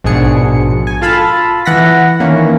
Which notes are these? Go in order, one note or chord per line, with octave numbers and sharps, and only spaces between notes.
A#1 G#2 B2 D4 G#4 C#7
G#5
F4 A4 F5 A5 B5
E3 F#5 A#6 B6
D#3 E3 A#3 C#4